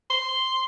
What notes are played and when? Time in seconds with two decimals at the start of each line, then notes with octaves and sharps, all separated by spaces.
0.10 C6